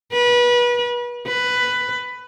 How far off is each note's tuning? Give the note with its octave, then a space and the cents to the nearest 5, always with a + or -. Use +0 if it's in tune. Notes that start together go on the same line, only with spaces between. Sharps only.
B4 -30
B4 +10